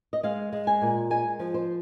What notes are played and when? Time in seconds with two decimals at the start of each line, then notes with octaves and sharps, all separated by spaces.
0.13 D#5
0.23 G#3 F5
0.53 G#3
0.67 G#5
0.82 A#2
1.10 G#3 G#5
1.39 F3
1.54 C5